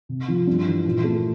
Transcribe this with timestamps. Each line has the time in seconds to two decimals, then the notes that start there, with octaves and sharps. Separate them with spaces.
0.09 C3
0.28 F3
0.47 G2
0.66 E3
0.86 A#2
1.04 A3